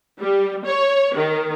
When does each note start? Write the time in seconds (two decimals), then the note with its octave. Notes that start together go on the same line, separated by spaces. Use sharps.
0.20 G3
0.66 C#5
1.16 D#3